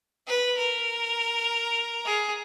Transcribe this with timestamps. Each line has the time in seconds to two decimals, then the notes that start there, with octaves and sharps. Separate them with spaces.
0.28 B4
0.58 A#4
2.05 G#4